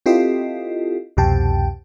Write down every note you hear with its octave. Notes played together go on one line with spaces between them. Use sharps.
C4 E4 F4 G4 A4 D#5
C2 F2 B2 G4 G5 A5